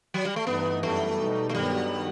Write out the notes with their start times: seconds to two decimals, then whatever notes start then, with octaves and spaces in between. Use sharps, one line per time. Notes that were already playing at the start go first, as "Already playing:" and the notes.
0.14 F#3
0.25 G3
0.36 A3
0.47 G2 E3 A3 B3 D#4
0.82 F#2 E3 G3 A3 B3
1.18 B2 G3 D#4
1.49 A3
1.54 G2 D#3 F#3 G3 B3